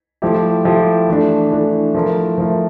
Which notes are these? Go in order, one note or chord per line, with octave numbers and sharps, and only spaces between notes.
F3 A3 E4 G4
F3 A3 E4 G4
E3 A3 D4
E3 A3 D4
F3 A3 E4 A#4
F3 A3 E4 A#4